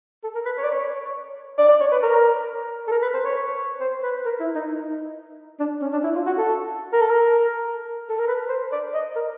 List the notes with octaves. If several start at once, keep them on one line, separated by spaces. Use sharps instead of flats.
A4
A#4
B4
C#5
D5
C#5
D5
D5
C#5
B4
A#4
A4
A#4
B4
C5
C#5
C5
B4
A#4
E4
D#4
D#4
D4
C#4
D4
E4
F4
F#4
A4
A#4
A4
A#4
A4
A#4
B4
C5
D5
D#5
A#4